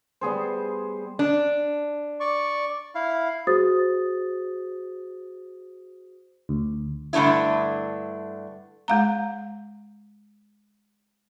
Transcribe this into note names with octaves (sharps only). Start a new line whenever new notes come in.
G3 B3 G#4 C5
D4
D5 C#6
E4 F5
F#4 G#4 C5 D#6 A6
D2
G2 D3 A3 D4 E4
G#3 F5 A#5